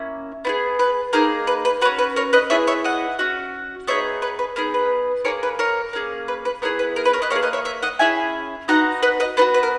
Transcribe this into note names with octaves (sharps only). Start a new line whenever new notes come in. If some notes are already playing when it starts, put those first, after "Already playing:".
Already playing: A#3 C#4 E4
B3 E4 G#4
B4
A#3 D#4 G#4 A#4
B4
B4
C#4 F#4 B4
B4
A#4 C#5
B4 D#5
B3 E4 G#4 C#5 E5
C#5 E5
D#5 F#5
C#4 F#4
B3 D#4 G#4 C#5 E5
B4
B4
B3 D#4 G#4 A#4
B4
A#3 E4 G#4 A#4 C#5
B4
A#4 C#5
A#3 C#4 G#4
B4
B4
B3 E4 G#4 A#4 C#5
B4
A#4
B4
A#4 C#5
B4 D#5
A#3 D#4 A#4 C#5
G#4
B4 D#5
C#5 E5
C#5 E5
D#5 F#5
C#4 E4 G#4 E5 G#5
B3 D#4 F#4 F#5 A#5
B4 D#5
B4 D#5
B3 D#4 F#4 B4
B4
A#4